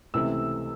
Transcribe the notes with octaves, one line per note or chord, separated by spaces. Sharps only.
C#2 C3 E3 A3 E6